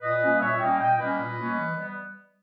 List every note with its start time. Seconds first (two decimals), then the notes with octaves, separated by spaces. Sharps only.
0.01 A#2 B4 D#5
0.22 G3 A#3 C#4
0.40 A#2 C#5 E5
0.59 G3 A#3 C#4 D#5 G5
0.79 A#2 D#5 G5
0.98 G3 A#3 C#4 B4 D#5
1.18 A#2
1.36 G3 A#3 C#4
1.56 E3
1.76 G3 B3